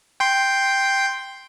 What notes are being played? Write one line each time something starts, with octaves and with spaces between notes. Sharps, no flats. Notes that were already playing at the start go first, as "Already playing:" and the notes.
G5 C6